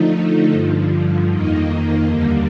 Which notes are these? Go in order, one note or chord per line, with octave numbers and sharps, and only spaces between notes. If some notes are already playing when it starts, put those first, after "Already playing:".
Already playing: D3 F3 A3 D#4
G2 D3 F3
F2 D#3 A#3 D#4
D#2 D3 G3 A#3